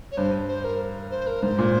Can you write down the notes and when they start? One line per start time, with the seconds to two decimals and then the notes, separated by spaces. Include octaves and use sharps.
0.12 C#5
0.17 G2 C5
0.48 C5
0.64 A#4
1.11 C5
1.27 A#4
1.43 G#2 C5
1.58 A#2